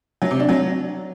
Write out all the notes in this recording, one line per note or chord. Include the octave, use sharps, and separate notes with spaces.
F#3
C3
D4
F#3